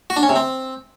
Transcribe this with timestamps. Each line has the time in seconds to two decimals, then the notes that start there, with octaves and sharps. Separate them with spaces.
0.10 F#4
0.16 D4
0.23 C#4
0.29 C3
0.36 C4